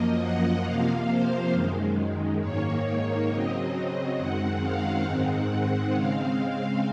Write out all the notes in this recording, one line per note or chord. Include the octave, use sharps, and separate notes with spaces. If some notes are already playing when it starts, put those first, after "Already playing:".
Already playing: F#2 F3 A#3 D#5
F#5
C3 F3 A#3 F5
C5
F#2 D#3 G#3
G#2 D#3 A#3 C#5
C#3 F#3 C4 D#5
F#2 D#3 G#3 C4 F#5
F5
G#2 D#3 G#3 C4 F#5
F#5
C#3 G#3 C4 F5